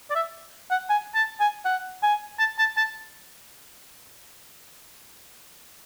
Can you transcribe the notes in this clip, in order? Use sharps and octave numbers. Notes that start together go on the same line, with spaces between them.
D5
E5
F#5
G#5
A5
G#5
F#5
G#5
A5
A5
A5